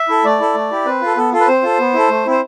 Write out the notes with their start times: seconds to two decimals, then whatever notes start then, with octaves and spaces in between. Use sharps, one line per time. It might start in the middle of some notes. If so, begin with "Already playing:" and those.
Already playing: E5
0.09 E4 A4
0.24 A3 D5
0.40 E4 A4
0.55 A3
0.71 E4 G4
0.86 C4 B4
1.01 F4 A4
1.17 B3 A4
1.32 F4 A4
1.40 B4
1.47 C4 C5
1.63 F4 A4
1.79 B3
1.93 E4 A4
2.09 A3
2.25 C4 E4 C5